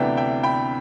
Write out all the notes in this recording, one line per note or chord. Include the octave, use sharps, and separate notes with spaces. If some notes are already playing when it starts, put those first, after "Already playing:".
Already playing: D2 C3 E3 B3 D4 E5 G5
E5 G5
G5 B5